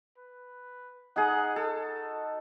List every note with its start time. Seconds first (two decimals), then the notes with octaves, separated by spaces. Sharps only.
0.17 B4
1.16 D#4 G#4 D#5 F#5
1.56 F#4 A4